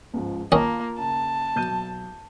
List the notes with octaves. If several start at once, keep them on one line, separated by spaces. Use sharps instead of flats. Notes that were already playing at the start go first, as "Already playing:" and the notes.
C#2 G#2 F3
D#3 A#3 C#4 F4 D#5 A5
C#3 A5
B1 G6 D#7